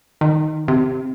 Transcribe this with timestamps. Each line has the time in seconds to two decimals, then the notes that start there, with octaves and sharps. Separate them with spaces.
0.21 D#3
0.68 C3